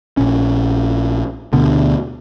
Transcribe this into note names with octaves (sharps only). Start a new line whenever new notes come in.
A#1 A#2 C#4
D2 B2 D3